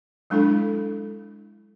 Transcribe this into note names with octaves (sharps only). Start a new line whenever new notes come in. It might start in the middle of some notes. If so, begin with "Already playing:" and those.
F#3 G#3 D4 E4 A4